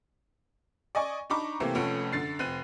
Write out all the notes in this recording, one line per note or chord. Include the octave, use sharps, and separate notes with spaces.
D5 D#5 G#5 C#6
D4 D#4 A#5 B5 C#6 D6
C3 E3 A3 A#3 C4 G4
F1 F2 A3 C#4 F#5 D7
F#2 D3 A6 C7
F1 C4 F#6 D#7